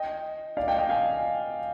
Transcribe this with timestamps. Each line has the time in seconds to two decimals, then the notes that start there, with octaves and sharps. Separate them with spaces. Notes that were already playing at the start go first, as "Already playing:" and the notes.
Already playing: D#5 G5
0.57 D5 F5
0.67 D#5 G5
0.78 D#5 G5
0.89 F5 G#5